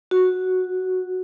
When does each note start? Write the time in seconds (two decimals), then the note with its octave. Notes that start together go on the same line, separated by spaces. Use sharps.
0.11 F#4